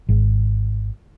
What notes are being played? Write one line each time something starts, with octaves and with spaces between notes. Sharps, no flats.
G#1